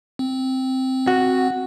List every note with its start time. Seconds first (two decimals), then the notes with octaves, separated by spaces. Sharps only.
0.19 C4
1.07 F#4